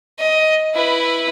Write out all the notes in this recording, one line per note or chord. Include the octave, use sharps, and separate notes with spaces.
D#5
E4 B4